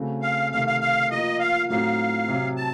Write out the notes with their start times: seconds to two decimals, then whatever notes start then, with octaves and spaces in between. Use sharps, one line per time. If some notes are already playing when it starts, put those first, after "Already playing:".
Already playing: C#3 A3 C4 F#4
0.22 F5
0.52 C3 D#3 A3 F5
0.67 F5
0.81 F5
1.10 F3 A#3 F4 D#5
1.40 F5
1.69 A2 F#3 C4 D#4 F#4 F5
2.28 C3 F#3 C4
2.57 A5